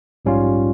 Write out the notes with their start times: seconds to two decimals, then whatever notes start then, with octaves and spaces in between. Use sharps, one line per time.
0.25 A#1 G#2 G3 C#4 F4